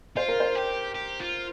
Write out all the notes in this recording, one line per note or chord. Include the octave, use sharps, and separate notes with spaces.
F4 C5
A#4
C5
G4
G4
F4